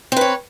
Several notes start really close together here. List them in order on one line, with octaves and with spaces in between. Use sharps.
C4 B4 C#5